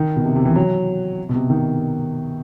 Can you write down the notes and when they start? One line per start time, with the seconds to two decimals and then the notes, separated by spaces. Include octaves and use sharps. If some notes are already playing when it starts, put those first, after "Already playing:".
Already playing: D#3
0.16 B2
0.25 C3
0.36 C3
0.45 E3
0.55 F#3
1.29 B2
1.34 C3
1.50 D#3